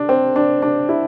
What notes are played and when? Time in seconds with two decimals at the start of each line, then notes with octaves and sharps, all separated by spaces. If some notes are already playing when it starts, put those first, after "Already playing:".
Already playing: D4
0.09 C4
0.36 D4
0.62 D4
0.89 E4